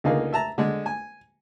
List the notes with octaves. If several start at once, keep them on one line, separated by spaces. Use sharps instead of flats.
C#2 D3 A#3 D#4 G#4 F5
E5 A5 A#5
D3 G#3
G#5